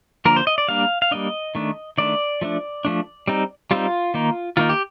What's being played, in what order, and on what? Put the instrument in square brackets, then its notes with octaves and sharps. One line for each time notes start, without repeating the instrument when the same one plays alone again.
[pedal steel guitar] D3 F3 A#3 A#4
C5
D#5
D5
G3 A#3 D4 F5
F5
G3 A#3 D4 D#5
D#3 A3 D4
D#3 A3 D4 D5
F3 A3 D4
F3 A3 D4
G3 C4 D#4
G3 C4 D#4 F4
D#3 A#3 D#4
D#3 A#3 D#4 F4
G4